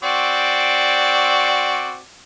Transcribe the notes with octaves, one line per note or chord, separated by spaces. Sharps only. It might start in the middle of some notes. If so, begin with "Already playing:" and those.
C4 F#4 D5